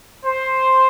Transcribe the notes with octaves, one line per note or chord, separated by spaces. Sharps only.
C5